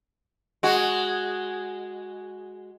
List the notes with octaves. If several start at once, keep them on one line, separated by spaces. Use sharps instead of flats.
G#3 F#4